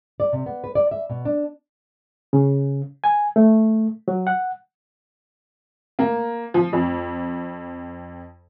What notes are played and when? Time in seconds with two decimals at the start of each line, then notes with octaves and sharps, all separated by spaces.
0.20 D5
0.33 C3
0.46 B3
0.64 B4
0.75 D5
0.91 E5
1.09 B2
1.25 D4
2.33 C#3
3.04 G#5
3.36 A3
4.08 F#3
4.27 F#5
5.99 A#3
6.54 F3
6.73 F2